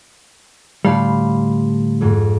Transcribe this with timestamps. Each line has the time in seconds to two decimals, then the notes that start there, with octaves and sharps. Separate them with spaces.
0.85 D2 A2 G3 F5 B5 C6
2.01 F2 G#2